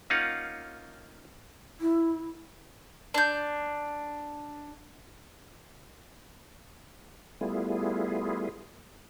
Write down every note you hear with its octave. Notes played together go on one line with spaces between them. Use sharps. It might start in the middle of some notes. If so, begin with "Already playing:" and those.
A#3 C#4 D#4 F4 F5 F#5
E4
D4 G6
G3 A3 B3 E4 F4 G#4